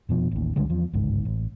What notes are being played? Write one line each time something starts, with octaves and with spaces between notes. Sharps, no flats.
F1 B2 F3
A1 D#2
C#2 D3 G3 G#3
E2 F3
G1 C#2 G#2
A1